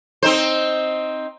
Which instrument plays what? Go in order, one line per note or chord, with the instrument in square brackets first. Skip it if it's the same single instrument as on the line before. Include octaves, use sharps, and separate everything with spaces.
[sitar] C4 D#4 C5